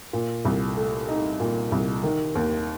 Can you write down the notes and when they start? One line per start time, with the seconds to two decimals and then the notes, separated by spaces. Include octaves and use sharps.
0.13 A#2
0.45 C2
0.77 A3
1.08 D#4
1.40 A#2
1.72 C2
2.03 D#3
2.35 D#2